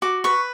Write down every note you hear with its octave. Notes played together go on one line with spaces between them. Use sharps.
F#4 D6
B4 C#6